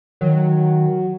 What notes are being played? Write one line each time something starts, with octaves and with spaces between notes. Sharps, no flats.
D#3 F#3